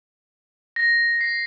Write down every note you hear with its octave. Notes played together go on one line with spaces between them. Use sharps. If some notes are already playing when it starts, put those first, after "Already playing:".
A#6
C7